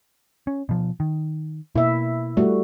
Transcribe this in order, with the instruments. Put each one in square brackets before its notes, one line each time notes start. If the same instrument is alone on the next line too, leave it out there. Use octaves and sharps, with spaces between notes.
[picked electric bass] C#4
B2 F3
D#3
[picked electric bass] B2 A#3 [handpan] E4 E5
[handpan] G3 A3 F#4